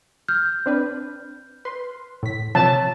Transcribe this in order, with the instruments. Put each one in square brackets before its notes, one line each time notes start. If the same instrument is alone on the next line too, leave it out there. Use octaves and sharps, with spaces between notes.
[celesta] F6 G6
[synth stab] C4 D4 B4
B4 C6
A2 B6
[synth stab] C3 F3 [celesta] C#5 [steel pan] A5